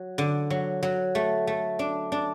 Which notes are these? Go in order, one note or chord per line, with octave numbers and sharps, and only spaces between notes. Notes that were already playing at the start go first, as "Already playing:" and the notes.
Already playing: F#3
D3
F#3
F#3
A3
A3
D4
D4